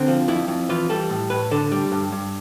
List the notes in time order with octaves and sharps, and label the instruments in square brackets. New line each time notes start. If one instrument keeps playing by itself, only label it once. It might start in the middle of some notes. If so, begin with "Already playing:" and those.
Already playing: [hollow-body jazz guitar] D3 C4
F3
F2 E4
F2
E3 F4
G3 A4
A2
A2 B4
D3 A4
G3
G2
G2